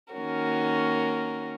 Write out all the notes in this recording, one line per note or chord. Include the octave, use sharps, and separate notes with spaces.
D#3 A#3 C#4 F#4 A#4